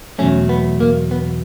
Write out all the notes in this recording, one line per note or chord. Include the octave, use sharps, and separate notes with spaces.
E2 B2 F#3 A3 C#4
B3
A#3
B3